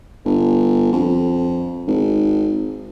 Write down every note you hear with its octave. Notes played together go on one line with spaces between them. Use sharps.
G1
F2
G#1